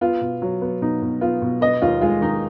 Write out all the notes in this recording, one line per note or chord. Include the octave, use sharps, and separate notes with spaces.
B3 F4
B2
F#3
B3
B2 D#4
B2
B3 F4
B2
B3 D#5
D#2 F4
G#3 F4
D#3 D#4